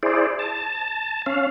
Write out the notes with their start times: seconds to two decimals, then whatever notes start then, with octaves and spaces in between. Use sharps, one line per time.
0.03 E4 G#4 C5 D5
0.39 A5
1.26 C#4 F5